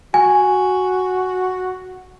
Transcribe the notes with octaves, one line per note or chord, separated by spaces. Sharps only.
F#4 G#5